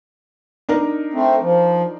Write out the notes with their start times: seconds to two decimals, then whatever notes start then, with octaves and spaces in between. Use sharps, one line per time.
0.69 D4 D#4 A#4
1.14 A3 C4
1.41 F3